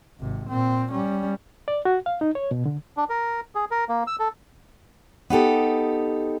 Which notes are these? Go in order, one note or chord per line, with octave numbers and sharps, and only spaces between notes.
G#1 C3
A#2 C4
G3 C#4
D5
F#4
F5
D#4
C#5
B2
D3
D4
A#4
G#4
A#4
A#3
E6
A4
B3 D#4 G4 A4